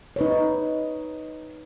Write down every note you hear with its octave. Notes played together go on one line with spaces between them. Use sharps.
D#4 B4 C#5